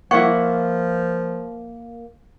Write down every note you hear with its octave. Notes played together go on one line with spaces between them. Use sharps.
F3 A#3 E4 F#5 C#6